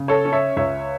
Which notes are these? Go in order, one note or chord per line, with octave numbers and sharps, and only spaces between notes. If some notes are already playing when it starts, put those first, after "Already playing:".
Already playing: C#3
A4 C#5
C#4
C#5 E5
C#2 C#5 E5